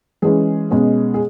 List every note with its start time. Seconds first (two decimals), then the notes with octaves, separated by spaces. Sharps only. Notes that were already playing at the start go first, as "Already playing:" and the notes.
0.22 E3 G#3 C#4 G#4
0.71 B2 G#3 C#4
1.14 G#4